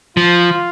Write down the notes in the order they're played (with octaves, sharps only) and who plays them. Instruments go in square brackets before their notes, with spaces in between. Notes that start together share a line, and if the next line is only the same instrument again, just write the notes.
[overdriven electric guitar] F3 [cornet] F4